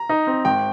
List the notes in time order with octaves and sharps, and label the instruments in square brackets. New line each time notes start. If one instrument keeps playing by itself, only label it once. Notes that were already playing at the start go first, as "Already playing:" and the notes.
Already playing: [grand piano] A#5
D#4
C4
G#1 G5